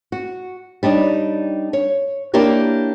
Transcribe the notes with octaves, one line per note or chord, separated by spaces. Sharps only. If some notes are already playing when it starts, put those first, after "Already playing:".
F#4
G3 D4 D#4 C#5
C#5
A#3 D4 E4 G4 A#4 C#5